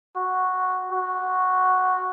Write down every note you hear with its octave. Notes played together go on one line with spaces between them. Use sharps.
F#4
F#4